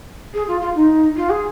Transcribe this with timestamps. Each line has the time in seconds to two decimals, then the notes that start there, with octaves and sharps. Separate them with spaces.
0.33 G#4
0.47 F4
0.61 F4
0.75 D#4
1.16 F4
1.29 G#4